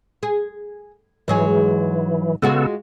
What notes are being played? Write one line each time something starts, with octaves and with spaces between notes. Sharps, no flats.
G#4
G#2 E3 F#3 G#4
C#3 G#3 B3 F4 F#4 A4